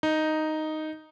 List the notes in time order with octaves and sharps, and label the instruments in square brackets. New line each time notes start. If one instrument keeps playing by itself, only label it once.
[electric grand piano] D#4